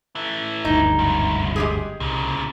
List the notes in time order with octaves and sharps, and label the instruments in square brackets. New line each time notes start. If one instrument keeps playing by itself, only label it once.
[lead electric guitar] E3 A3
[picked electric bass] F#1 D2 G2 [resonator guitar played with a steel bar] D#4
[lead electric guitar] C2 G#2
[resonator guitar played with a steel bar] G#3 G4 G#4
[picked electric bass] C2 [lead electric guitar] A#2 C#3